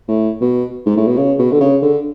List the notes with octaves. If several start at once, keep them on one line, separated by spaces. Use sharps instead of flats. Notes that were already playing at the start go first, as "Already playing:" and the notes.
A2
B2
G#2
A2
B2
C#3
B2
D3
C#3
D3